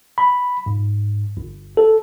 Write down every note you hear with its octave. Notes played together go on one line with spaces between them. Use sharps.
B5
G#2
G1
A4